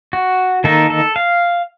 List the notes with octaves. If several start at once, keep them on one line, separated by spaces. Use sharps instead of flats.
F#4
D#3 A#3 D#4 A4
A4
F5